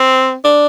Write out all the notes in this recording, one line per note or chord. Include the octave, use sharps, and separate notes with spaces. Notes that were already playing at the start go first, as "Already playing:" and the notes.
Already playing: C4
D4